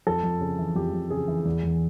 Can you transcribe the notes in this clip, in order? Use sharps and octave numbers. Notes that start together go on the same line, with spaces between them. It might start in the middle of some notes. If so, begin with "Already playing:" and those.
F2 A4
F2
C#3
E3
F2 G4
F2
C#3 G#4
E3
E2
E2